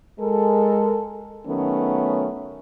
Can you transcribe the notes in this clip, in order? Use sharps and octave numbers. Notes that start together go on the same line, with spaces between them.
G#3 A4 A#4
D#3 F#3 A3 B3 C#4